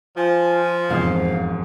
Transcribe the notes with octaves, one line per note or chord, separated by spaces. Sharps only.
F3 F4 G#5
E1 F2 G#2 C5 F5